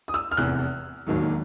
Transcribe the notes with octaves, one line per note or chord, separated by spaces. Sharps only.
D#6
E6
F6
F1 E2 C3 F#6
E1 D#2 D#3 F#3